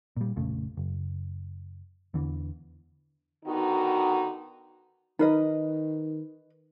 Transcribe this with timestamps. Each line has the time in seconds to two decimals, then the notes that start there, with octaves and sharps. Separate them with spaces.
0.17 A#2 G3
0.36 A#1 F2 C#3 A3
0.77 F#1
2.14 E2 D3 E3
3.45 D3 D#3 B3 D#4 F#4
5.19 D#3 D#4 A#4 B4 D#5